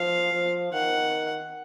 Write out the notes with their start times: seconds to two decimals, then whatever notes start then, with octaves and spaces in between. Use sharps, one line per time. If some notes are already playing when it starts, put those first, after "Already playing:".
Already playing: F3 F5
0.33 F3
0.73 D#3 F#5